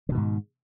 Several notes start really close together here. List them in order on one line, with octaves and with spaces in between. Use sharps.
D3 B2 D#3 G#2